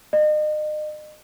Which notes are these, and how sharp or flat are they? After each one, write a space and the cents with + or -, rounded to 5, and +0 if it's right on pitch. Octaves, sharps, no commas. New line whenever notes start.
D#5 -35